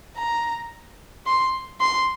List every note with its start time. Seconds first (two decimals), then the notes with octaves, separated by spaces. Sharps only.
0.17 A#5
1.26 C6
1.81 C6